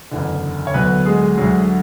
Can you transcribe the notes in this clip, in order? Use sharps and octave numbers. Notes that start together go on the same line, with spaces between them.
F#1 E2 D3
C#5
D2 D3 F#3 B3 B4
G#3 G#4
D2 D3 F#3